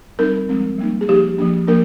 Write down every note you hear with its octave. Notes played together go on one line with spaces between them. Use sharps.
G3 C4 D#4 A#4
F3 G#3 C4
G3 A#3 D#4
G#4
F3 A#3 D#4 G4
F3 A#3 D4
F3 A#3 D4 A#4